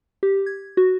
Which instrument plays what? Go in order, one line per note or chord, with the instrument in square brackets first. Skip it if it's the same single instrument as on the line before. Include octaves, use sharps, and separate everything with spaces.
[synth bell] G4
G#6
F#4